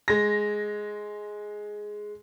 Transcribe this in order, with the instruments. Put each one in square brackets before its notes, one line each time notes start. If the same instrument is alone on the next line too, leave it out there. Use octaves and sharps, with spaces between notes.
[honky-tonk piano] G#3 A#6